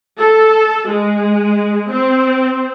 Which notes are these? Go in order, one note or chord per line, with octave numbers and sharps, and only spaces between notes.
A4
G#3
C4